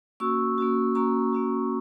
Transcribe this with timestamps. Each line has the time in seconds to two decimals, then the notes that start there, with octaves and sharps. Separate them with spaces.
0.20 A#3 C#4 F#4 C#6 E6
0.58 A#3 C#4 F#4
0.95 A#3 C#4 F#4 A#5 C#6
1.33 A#3 C#4 F#4